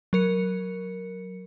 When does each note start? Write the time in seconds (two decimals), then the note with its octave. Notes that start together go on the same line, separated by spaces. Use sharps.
0.13 F#3 A#4 C#7